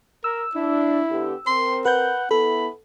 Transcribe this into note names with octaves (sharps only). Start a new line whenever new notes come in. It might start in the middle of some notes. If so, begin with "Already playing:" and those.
A#4 E6
D4 E4
D3 B3 G4
C4 A#4 C6
B4 F#5 G6
B3 E4 A4 B5